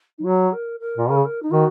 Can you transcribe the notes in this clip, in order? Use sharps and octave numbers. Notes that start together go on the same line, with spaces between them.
D#4
F#3 F#4
A#4
A#4
A#2
C#3 A#4
G#4
A#4
D#4
D#3 F#4